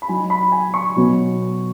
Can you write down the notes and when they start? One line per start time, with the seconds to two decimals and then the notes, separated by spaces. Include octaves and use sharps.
0.02 B5
0.09 F#3 D#4 G#5
0.30 B5
0.52 G#5
0.74 C#6
0.96 B2 F#3 B3 D#4